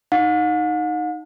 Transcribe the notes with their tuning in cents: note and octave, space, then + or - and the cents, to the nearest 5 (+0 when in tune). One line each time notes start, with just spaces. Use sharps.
D#4 +0 F#5 -45